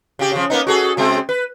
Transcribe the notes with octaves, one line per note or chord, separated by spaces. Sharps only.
C#3 G4
C#3 F3
A#3 B3 D#4
F#4 G#4 A4
C#3 G#3 C4
B4